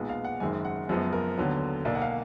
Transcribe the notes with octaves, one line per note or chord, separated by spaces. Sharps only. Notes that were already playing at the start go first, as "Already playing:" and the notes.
Already playing: B1 A#2 G#3 B3
F5
F#5
F#1 F#2 D#3 G#3 G#5
F#5
F#1 F#2 F3 G#3 B3 G#4
A#4
D#2 D3 F#3 B3
B1 B2 A#3 D5
F#5
F5